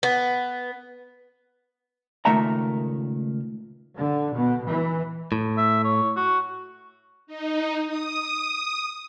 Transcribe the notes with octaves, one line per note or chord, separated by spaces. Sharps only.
B3
C#2 A#2 D#3 A3 E5 A#5
D3
B2
E3
A2
E5
C#5
F#4
D#4
D#6